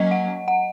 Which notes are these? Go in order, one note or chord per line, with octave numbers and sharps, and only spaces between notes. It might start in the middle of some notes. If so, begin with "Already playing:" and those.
Already playing: F#3 A#3 C#4 D#5
F#5
F#5